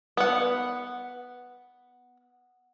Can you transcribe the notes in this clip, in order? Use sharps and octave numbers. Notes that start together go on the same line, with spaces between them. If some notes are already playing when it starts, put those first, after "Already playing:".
B3 F#5